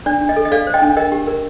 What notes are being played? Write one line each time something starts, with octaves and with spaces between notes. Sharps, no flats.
D4 D5
D4
D#5
A4
D#5
A4 D5 F5
C5
D#5 G5
D4
A#4 D#5
G4
A#4